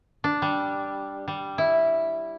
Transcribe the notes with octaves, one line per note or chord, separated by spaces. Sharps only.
D4
G3
G3
E4